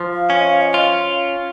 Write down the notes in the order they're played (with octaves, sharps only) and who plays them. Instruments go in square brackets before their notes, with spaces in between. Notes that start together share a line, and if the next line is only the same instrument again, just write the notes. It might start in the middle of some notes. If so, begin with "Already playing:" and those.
Already playing: [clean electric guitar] F3
[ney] F5
[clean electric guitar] C#4
[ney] D#5
F5
D#5
[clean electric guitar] F4 [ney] F5